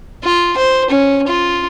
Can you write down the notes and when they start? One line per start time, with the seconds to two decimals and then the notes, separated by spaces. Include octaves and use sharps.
0.24 F4
0.57 C5
0.90 C#4
1.28 F4